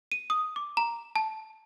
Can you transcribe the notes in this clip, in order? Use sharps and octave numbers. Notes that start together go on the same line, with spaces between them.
D#7
D#6
D6
A#5
A5